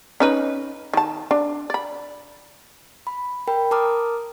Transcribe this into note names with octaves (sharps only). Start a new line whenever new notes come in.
C#4 D#4 B4
D#3 A5
D4
D5 B5
B5
A#4 G5 B5
A#4 A5 A#5 D6 D#6 F6